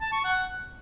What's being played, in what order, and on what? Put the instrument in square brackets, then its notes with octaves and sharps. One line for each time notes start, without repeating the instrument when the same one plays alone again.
[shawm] A5
C#6
F#5